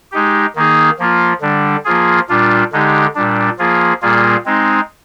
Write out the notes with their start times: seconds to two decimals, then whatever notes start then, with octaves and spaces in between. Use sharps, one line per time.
0.12 G#3 D#4 G4
0.56 D#3 A#3 D#4 G#4
0.99 F3 A#3 F4
1.41 D3 G3 D4
1.85 F3 A#3 F4 G#4
2.29 A#2 G3 D4 F4
2.73 D3 G#3 D#4 G4
3.15 A#2 G3 D4
3.59 F3 A#3 F4 G#4
4.02 A#2 G3 A#3 F4 G#4
4.46 G#3 C4 D#4